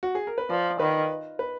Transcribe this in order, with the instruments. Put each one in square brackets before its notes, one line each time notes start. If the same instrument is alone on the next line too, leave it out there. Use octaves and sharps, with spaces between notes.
[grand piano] F#4
G#4
A#4
B4
[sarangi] F3 [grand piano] D5
[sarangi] D#3 [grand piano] B4
[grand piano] B4